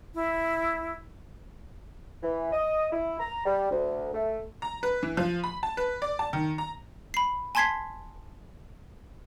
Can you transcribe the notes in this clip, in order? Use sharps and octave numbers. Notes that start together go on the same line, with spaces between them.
E4
E3
D#5
E4
A#5
G3
D2
A3
A#5
B4
E3
F3
B5
A5
B4
D5
A5
D#3
A#5
B5 C7
G#5 A5 C6 G#6 B6 C7